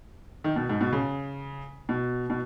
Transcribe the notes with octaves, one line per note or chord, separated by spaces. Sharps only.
D#3
B2
G#2
B2
C#3
B2
B2